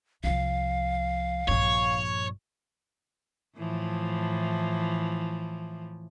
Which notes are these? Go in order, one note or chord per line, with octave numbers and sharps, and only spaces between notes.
C2 F3 F5
A#1 G2 C#5
A2 E3 F3